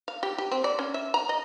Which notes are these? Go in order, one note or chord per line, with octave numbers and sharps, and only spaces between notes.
F5
G4
G4
C4
D5
C#4
E5
A#5
D#5